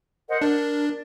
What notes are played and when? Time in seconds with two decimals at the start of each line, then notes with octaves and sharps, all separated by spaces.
0.29 A#4 C5 D#5 F#5
0.41 D4 A#4 D5